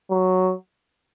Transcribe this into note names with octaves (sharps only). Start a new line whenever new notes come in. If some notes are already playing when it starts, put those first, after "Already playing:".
F#3